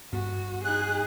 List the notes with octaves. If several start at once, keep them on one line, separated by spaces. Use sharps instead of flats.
G2 B3 F#4
D#4 G#4 F#6